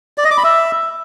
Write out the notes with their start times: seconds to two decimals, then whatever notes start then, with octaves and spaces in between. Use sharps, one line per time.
0.18 D5
0.24 D#5
0.31 D6
0.37 B5
0.44 E5